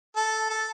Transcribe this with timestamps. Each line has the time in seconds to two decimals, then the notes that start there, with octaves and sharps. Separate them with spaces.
0.16 A4
0.50 A4